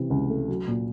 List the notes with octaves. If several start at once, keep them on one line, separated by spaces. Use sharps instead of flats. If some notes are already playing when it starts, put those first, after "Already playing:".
Already playing: C3 E3
C#2
A3
F#3
A#2